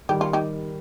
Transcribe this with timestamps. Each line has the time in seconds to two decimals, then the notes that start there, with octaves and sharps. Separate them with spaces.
0.09 D#3 G3 G4
0.21 F4
0.33 D#4 G4